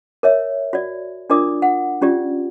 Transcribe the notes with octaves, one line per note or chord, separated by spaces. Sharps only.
A#4 C#5 E5
F#4 D5
D4 F4 A#4 D5 D6 D#6
F#5
C#4 F4 G4 D5